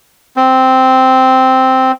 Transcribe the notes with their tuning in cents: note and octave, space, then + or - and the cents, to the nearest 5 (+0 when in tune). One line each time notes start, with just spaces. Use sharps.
C4 -5